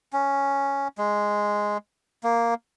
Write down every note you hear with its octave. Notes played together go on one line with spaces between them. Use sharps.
C#4
G#3
A#3